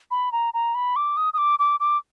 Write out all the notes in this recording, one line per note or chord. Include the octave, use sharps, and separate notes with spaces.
B5
A#5
A#5
B5
D6
D#6
D#6
D6
D6
D6